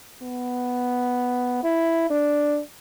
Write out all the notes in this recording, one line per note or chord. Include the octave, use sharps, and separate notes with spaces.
B3
E4
D4